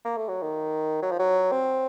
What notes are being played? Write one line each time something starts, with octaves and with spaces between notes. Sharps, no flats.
A#3
A3
F#3
D#3
F#3
F3
F#3
C4